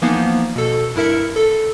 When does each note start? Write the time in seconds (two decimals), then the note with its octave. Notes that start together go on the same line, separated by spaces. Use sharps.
0.02 E3 F3 A#3 B3 D#4
0.56 B2 A4
0.96 G2 E4 A#4 E5 C#7
1.36 A4